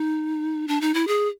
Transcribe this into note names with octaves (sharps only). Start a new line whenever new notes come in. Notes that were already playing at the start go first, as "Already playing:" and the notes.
Already playing: D#4
D4
D#4
E4
G#4